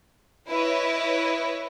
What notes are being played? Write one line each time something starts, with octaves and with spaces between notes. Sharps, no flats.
E4 B4 C#5 D#5